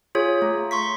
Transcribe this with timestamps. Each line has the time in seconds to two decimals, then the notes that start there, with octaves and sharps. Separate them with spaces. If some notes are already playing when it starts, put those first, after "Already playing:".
0.15 F4 G#4 C#5
0.42 A3
0.71 C6 C#6 B6